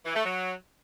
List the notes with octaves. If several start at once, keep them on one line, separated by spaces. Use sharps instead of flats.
E3
A3
F#3